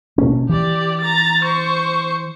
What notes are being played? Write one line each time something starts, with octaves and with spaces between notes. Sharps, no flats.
B2 A#3 C#4
E3 G4 D5
A#5 A6
C5 C#6